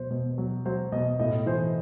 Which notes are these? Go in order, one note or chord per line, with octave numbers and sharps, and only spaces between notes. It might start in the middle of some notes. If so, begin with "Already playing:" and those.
Already playing: B2 F#3 C5
B2
F#3
F#3 C5
B2 D#5
A2 D#5
E3 C5